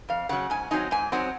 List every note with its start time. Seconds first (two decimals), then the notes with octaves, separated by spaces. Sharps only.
0.09 F2 F5
0.29 C#3 F#3 F#5
0.50 G#2 G#5
0.71 F#3 C4 D#4 G#5
0.91 G#2 G#5
1.12 F#3 C4 D#4 F#5